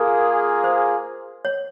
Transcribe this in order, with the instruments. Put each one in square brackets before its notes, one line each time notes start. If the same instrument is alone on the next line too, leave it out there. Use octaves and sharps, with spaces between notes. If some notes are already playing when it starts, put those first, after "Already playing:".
Already playing: [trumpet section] A#3 F4 G#4 [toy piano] A#4
[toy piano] C5
C#5